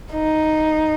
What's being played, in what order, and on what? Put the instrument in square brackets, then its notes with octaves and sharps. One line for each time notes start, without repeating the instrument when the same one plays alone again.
[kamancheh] D#4